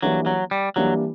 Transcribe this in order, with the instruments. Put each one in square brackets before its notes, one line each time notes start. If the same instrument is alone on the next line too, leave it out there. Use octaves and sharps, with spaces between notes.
[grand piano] E3 G3 A#3 D4 [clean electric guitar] F#3
[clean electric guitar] F#3
G3
[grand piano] E3 G3 A#3 D4 [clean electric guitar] F#3